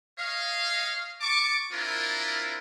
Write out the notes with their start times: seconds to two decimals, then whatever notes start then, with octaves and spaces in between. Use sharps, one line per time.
0.18 C#5 D#5 F5
1.21 A5 C#6 D6
1.72 C4 D4 E4 F4 A#4